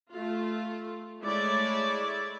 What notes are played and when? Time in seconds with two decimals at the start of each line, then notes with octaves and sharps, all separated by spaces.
0.12 A3 F4
1.21 G#3 A3 E4 C#5 D5